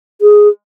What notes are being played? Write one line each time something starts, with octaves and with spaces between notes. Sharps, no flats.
G#4